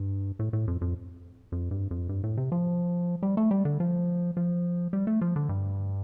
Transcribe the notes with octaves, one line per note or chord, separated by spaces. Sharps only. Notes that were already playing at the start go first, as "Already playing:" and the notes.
Already playing: G2
A2
A2
F2
F2
F2
G2
F2
G2
A2
C3
F3
G3
A3
G3
D3
F3
F3
G3
A3
F3
D3
G2